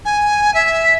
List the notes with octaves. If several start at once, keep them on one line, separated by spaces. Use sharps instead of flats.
G#5
E5